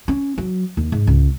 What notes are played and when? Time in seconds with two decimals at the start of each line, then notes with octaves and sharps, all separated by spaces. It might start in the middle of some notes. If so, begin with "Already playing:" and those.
0.08 C#4
0.38 F#3
0.77 D#2
0.92 G#2
1.07 C#2